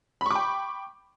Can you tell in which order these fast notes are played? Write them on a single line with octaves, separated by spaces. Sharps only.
B5 C#6 D6 G5